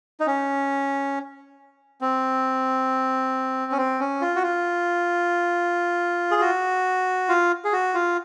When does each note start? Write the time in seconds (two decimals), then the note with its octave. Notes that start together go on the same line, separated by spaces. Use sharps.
0.20 D#4
0.27 C#4
2.01 C4
3.72 C#4
3.77 C4
4.00 C#4
4.21 F4
4.36 F#4
4.43 F4
6.31 G#4
6.41 F#4
7.29 F4
7.64 G#4
7.73 F#4
7.94 F4